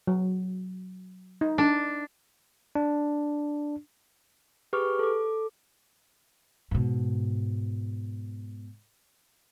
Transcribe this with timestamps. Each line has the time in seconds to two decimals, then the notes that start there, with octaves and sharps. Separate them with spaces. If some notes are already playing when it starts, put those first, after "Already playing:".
0.07 F#3
1.41 D#4
1.58 D4
2.75 D4
4.73 G4 G#4 B4 C#6 D6 F6
4.99 A4 D6
6.71 G#2 B2